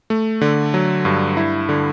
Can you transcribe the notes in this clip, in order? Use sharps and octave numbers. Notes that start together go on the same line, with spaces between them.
A3
D3
F#3
G2
E4
D3